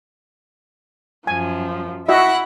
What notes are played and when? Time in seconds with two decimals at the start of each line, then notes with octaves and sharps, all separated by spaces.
1.27 F#2 F3 G#5
2.09 E4 F#4 D#5 E5 F#5